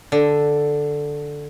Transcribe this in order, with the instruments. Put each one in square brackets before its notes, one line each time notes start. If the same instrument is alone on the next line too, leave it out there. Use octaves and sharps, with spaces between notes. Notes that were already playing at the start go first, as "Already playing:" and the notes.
[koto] D3